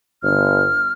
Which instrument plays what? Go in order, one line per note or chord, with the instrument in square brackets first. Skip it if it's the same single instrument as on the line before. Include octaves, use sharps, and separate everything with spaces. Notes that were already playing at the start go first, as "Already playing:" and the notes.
[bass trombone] G1 [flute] F6